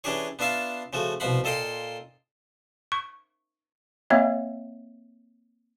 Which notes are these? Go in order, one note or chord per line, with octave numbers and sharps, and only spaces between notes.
E3 C#4 D4 G4 G#4 C#5
B3 D4 F4 E5 F5 A5
C#3 F3 A3 F#4
C2 B2 F3 F5 F#5 B5
A#2 A4 D#5 F5 G5 C6
C#6
A#3 C4 C#5 D#5 E5